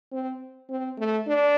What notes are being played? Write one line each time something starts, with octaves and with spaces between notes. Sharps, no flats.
C4
C4
A3
D4